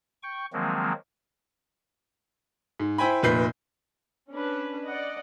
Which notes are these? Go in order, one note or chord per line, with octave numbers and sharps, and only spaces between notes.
G5 C#6
D#3 F3 F#3 G#3 A#3 C4
G#2
E4 C5 G5 G#5 B5
F1 A#2 B4 G6 C7
C#4 D4 B4
D5 D#5 F#5